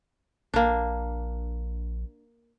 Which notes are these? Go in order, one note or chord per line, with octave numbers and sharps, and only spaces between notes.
A#1 A#3 D4